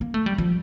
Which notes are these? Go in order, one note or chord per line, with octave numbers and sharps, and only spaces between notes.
A#3
A3
G3
F3